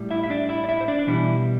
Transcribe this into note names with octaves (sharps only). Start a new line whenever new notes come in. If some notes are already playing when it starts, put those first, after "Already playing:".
Already playing: A2 G3
E4 E5
E5
D4 D5
E4 E5
D5
E4 E5
C5
D4 D5
D4
B2 E3 G3 E4